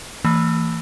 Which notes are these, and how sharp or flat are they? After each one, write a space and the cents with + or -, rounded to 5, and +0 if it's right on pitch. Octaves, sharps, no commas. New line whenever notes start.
E3 +0 A#3 -45